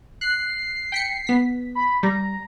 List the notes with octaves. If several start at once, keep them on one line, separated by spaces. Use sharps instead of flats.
F#6 C7
G5 B6 C#7
B3 B6
B5
G3 A#5